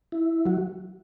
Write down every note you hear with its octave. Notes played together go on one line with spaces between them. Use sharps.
E4
F#3 F#4